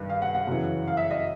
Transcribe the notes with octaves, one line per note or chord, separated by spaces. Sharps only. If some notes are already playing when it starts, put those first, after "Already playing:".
Already playing: G2 D#3
F5
F#5
F#5
F#2 C#3 E3
F5
E5
D#5